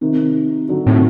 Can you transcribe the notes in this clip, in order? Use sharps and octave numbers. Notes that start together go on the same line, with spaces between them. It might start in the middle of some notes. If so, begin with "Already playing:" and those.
C3 D#3
D3 F#3
A2 C3 D#3